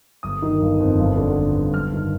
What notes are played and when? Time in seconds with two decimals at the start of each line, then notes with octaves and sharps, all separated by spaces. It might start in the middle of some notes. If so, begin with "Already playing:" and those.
0.23 G1 D#6
0.42 D#3
0.62 G1
0.80 F2
0.99 G1
1.17 D3
1.36 G1
1.55 G2
1.74 G1 F6
1.93 D#3